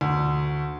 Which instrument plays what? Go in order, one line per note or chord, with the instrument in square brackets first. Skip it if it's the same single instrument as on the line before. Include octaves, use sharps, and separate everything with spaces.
[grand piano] D2